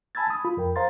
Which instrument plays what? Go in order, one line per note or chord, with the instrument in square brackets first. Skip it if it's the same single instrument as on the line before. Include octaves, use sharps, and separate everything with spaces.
[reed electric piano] G#5 A5 B5 E6 G#6 A6
D#6
F4 B5
F2 A#4 G5
C5 F5 A#5 C6 A6